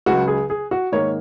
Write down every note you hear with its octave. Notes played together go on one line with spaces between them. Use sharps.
C#2 C#3 F#3 F#4
G#4
G#4
F#4
G#2 D#3 A#3 C#5